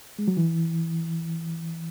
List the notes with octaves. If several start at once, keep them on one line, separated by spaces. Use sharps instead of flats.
G#3
F#3
E3